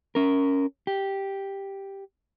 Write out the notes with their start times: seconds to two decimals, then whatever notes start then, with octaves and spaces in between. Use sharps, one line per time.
0.15 C#4 A#4
0.87 G4